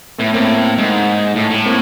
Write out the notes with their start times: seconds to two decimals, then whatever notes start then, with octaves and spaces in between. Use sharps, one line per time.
0.18 A2 A3 B3
0.33 A2 A#3 C4
0.78 G#2
1.36 A2
1.51 A2
1.66 A#3 C4